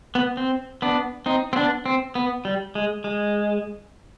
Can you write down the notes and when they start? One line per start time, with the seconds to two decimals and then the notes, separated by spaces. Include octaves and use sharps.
0.15 B3
0.37 C4
0.82 B3 D4
1.26 C4 D#4
1.53 C4
1.56 B3 D4
1.86 C4
2.15 B3
2.45 G3
2.75 G#3
3.04 G#3